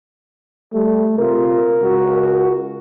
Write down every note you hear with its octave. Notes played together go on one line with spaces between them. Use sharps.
G3 A3
C3 F4 A#4
C#2 F#4